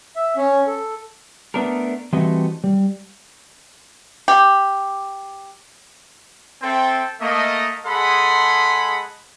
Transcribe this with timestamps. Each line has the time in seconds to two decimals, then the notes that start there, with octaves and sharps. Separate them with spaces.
0.16 E5
0.36 C#4
0.67 A4
1.54 A3 B3 D4 A4 A#4
2.13 E3 G3 A3 C4 F#4 D#5
2.64 G3
4.28 G4
6.62 C4 A4 C5 E5 G5
7.21 A3 A#3 D#5
7.86 G#3 G#4 A4 F#5 B5 C6